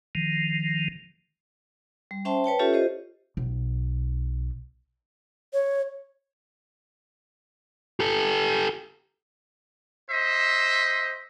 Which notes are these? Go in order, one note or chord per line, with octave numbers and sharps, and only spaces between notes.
D#3 F3
G3
C#4 C5 E5 G5 A5 C6
B4 C#5 G5 A5
C#4 F4 G4 A4 C#5 E5
F4 G4 C5 D#5
B1
C#5
G4 A4
C5 D#5 E5